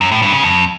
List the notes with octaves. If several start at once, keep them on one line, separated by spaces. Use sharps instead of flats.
F#2
A2
G2
C#3
F2